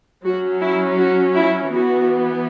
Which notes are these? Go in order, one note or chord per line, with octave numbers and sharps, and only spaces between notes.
F#3 C#4 F#4
E4
F#4
E4
E3 B3 F#4